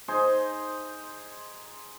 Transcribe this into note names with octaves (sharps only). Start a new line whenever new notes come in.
D#4 G#4 C5